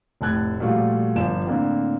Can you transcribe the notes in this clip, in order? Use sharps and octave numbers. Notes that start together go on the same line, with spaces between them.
F1 A2 A5 F#6 G#6
A#2 F3 G3 A3 F4 F#4
G1 F3 G#5 E7
A2 D3 A#3 C4